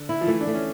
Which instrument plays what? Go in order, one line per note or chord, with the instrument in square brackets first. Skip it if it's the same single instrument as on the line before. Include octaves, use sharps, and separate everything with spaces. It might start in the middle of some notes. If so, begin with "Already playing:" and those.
Already playing: [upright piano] D3
[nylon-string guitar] E4
[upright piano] F3
[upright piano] E3 [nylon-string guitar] A3
[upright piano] D4
[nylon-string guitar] A3
[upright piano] C#4